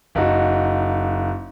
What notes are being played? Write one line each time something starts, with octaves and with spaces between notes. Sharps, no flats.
F#1 D#4 F#4